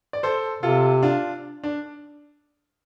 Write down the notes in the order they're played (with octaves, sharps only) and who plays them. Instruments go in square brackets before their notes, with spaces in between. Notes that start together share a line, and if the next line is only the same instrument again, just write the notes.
[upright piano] D5
A4 C5
[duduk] C3 [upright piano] F4 A4
[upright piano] D4 F4
D4